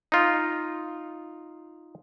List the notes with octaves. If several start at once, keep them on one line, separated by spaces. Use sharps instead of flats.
D#4 F4